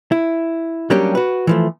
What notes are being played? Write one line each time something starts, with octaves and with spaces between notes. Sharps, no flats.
E4
F#3 G3 A#3 C#4 D4 G4
F#4 B4
E3 F3 A3